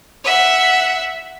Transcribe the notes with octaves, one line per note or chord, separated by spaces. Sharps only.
E5 F#5